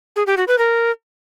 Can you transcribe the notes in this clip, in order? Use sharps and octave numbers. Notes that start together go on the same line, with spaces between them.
G#4
G4
F#4
B4
A#4